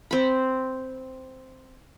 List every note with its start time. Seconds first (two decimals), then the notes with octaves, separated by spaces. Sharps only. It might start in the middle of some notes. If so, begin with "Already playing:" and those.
0.11 C4 B5